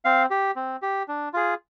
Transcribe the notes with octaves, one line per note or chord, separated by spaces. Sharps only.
C4 F5
G4
C4
G4
D4
F4 G#4